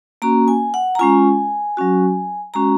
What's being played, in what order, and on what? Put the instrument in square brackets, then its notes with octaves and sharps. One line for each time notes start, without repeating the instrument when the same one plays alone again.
[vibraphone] A#3 C#4 F#4 A#5
G#5
F#5
A#5
G#3 C#4 F4 G#5
F#3 C#4 F#4
G#3 C#4 F#4 A#5